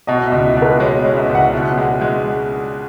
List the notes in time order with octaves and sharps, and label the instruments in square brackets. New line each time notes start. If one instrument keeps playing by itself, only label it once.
[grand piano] B2 [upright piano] D#5
[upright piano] E5
[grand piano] C#2
[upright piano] D#5
[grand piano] B2
[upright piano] B4
[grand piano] G#3 [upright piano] C#5
[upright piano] D#5
[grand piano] C#4
[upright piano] E5
[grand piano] C#2
[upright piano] F#5
[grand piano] B2 [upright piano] E5
[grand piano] G#3 [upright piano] F#5
[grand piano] G#3